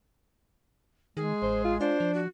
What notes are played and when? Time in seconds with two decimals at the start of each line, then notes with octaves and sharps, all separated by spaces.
1.17 D#3 G#3 G#4
1.42 A1 C5
1.65 F4
1.81 D4 F4 C5
2.00 F3
2.15 F#4